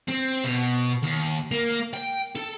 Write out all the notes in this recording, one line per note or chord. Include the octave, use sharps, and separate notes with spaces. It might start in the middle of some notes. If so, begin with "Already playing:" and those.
C4
B2
D#2
A#3
G5
A4